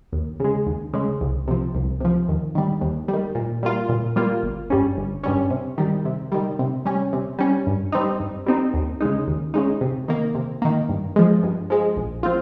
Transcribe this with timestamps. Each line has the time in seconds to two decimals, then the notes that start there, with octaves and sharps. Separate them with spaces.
0.13 D#2
0.40 C#3 G#3
0.66 D#2
0.93 C#3 G#3
1.21 C2
1.48 C3 F3
1.75 C2
2.00 C3 F3
2.29 D#2
2.55 D#3 G3
2.81 D#2
3.08 G3
3.13 D#3
3.35 A#2
3.63 G3 A#3 F4
3.89 A#2
4.16 G3 A#3 F4
4.43 G1
4.70 G2 G3 C#4
4.97 G1
5.24 G2 G3 C#4
5.50 C3
5.78 D#3 G3
6.05 C3
6.32 D#3 G3
6.59 C3
6.85 G3 C#4
7.13 C3
7.39 G3 C#4
7.67 G2
7.92 G3 C4 D#4
8.20 G2
8.46 G3 C4 D#4
8.74 D#2
9.00 C#3 G#3 D#4
9.27 D#2
9.54 C#3 G#3 D#4
9.81 C3
10.08 D#3 A#3
10.35 C3
10.62 D#3 A#3
10.89 G2
11.16 F3 G#3
11.43 G2
11.70 F3 G#3
11.96 A#1
12.23 F3 C4 F4